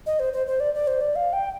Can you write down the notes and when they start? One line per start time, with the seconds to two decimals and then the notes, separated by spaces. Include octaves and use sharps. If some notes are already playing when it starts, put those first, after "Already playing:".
0.06 D#5
0.20 C5
0.33 C5
0.47 C5
0.60 D5
0.75 D5
0.87 C5
1.01 D5
1.16 F5
1.33 G5